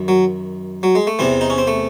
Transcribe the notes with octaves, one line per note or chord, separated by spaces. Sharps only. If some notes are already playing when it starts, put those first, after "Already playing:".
Already playing: F#2 D#3
F#3
F#3
G#3
A3
E2 C3 E3 C4
D#4
C#4
C4
A3